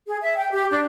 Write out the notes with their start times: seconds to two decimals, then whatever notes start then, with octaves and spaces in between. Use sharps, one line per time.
0.07 G#4
0.21 E5
0.37 G5
0.51 G4
0.71 D4